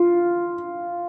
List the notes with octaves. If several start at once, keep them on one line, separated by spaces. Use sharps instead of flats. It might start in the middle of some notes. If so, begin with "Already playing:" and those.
Already playing: F4